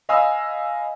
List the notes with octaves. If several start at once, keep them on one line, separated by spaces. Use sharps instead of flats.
D#5 F5 G#5 B5 D#6 E6